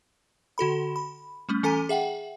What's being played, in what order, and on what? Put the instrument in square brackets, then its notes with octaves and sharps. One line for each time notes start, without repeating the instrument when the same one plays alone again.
[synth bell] D3 F#4 A4 B5
B5
G3 A3 C#4
E3 C#4 A4 G#5 A#5 D#7
G#4 E5 F#5 G5